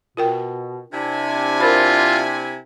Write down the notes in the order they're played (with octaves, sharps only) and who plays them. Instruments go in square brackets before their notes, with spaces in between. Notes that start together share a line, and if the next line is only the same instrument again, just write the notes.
[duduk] B2 [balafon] F4 A#4 G5
[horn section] C3 E4 G#5 [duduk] D4
[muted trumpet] F4 [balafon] A#4 C5 B5